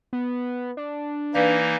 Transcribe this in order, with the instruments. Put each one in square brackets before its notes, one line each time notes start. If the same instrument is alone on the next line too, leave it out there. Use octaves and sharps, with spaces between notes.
[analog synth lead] B3
D4
[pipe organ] E3 A#3 D#4 [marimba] B4 D5 F5